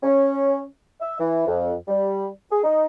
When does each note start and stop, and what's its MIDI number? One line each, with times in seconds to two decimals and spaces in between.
0.03 0.62 61
1.01 1.19 76
1.19 1.46 52
1.47 1.73 41
1.88 2.26 55
2.51 2.62 68
2.63 2.86 63